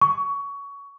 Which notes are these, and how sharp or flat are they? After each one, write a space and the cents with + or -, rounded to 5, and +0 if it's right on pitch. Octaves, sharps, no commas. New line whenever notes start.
C#6 +20